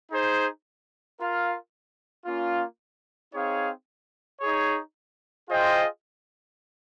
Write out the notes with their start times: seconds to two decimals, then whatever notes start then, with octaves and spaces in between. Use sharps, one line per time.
0.10 D#4 G#4 C5
1.18 F4 A#4 F5
2.25 A#3 C#4 F4
3.33 C4 D#4 G#4 C#5 F5
4.41 D#4 G#4 C#5
5.48 F4 G#4 C5 D#5 G5